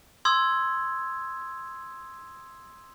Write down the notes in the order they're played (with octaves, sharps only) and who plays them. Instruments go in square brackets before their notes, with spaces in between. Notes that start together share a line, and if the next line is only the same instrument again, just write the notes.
[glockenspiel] C6 D#6 E6 G#6